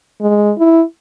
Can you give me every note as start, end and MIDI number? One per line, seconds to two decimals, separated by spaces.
0.21 0.52 56
0.58 0.83 64